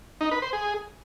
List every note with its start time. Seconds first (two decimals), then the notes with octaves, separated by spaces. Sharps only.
0.21 D#4
0.31 B4
0.42 C5
0.53 G#4